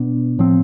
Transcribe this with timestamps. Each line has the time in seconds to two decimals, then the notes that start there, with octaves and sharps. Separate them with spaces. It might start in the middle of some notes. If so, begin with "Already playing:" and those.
Already playing: B2 B3 D4
0.39 A2 F3 C4